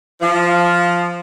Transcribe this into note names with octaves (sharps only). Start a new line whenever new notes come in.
F3